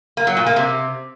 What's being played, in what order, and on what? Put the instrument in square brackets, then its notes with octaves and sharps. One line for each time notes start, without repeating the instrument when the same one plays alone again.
[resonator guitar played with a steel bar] A#3
F#3
A#2
A#3
C3